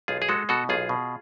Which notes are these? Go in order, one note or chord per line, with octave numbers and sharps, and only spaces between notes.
B1 F4 G#4
G#4
G#3 F#4 A4
B2 F#4 A4
B1 F4 G#4
B2